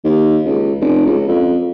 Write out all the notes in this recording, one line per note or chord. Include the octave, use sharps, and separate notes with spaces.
D#2
C#2
F1
C#2
F2